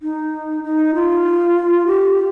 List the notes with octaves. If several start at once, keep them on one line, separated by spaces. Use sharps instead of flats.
D#4
D#4
F4
G4